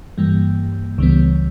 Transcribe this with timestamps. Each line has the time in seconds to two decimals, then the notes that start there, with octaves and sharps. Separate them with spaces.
0.18 G2 E3 G3 A#3
0.98 C#2 C#3 E3 G3 B3